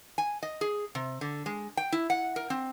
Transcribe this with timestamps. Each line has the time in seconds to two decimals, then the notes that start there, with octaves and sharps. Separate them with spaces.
0.18 G#5
0.43 D#5
0.61 G#4
0.95 C3
1.21 D3
1.46 G#3
1.77 G5
1.92 E4
2.10 F#5
2.36 A#4
2.50 C4